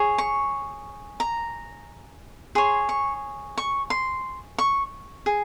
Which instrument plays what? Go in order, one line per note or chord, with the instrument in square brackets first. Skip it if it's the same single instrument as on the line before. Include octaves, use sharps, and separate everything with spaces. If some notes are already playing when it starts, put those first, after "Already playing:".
Already playing: [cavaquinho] G#4 C#5
C#6
A#5
G#4 C#5 C6
C#6
C#6
C6
C#6
G#4